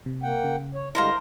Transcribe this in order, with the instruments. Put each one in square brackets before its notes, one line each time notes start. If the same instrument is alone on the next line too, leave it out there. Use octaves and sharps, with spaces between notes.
[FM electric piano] C3
[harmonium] A#3 F#5 G5
[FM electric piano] C#3
[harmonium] C#5
[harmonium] D3 G3 G#3 [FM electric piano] E4 F5 [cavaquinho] A#4 C5 A#5